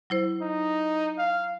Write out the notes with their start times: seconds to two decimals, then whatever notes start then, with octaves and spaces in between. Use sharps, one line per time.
0.10 F#3 E4 C5
0.41 D#4
1.19 F5